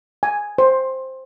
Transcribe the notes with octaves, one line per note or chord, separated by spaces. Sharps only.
G#5
C5